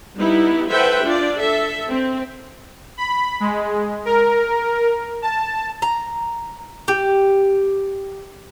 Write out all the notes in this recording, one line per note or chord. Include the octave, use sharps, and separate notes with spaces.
G3 B3 D#4 E4
A4 B4 C5 E5 F#5 G5
D4 F4 D5
A4 E5
C4
B5
G#3
A#4
A5
A#5
G4